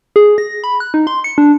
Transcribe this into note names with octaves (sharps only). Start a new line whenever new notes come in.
G#4
A#6
B5
F#6
D#4
C6
C#7
D4